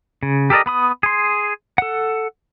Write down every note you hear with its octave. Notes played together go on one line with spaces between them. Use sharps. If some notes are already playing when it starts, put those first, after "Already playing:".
C#3
G4 A4 A#4 D5 D#5
B3 B5 D#6
G#4 C6
A4 F#5